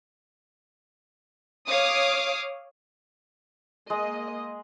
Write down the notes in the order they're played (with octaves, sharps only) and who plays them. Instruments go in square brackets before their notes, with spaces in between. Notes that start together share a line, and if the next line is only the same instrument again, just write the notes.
[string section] C#5 F5 D6 D#6
[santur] G#3 [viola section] A#3 D#5